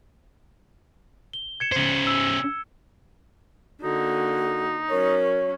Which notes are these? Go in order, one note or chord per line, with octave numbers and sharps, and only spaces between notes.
G7
G#6 C#7 E7
C#3 C5
E6
D3 A#3 D#4 F#4
F#3 C#4 A#4 C#5